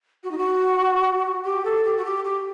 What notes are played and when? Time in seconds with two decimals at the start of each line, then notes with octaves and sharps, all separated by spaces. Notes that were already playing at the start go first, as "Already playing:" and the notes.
0.23 F#4
0.31 D#4
0.38 F#4
1.44 G4
1.65 A4
1.84 G4
1.97 F#4
2.05 G4
2.24 G4